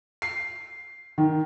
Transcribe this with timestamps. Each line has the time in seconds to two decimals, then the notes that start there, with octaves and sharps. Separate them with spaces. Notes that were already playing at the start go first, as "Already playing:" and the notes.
0.22 C7
1.18 D#3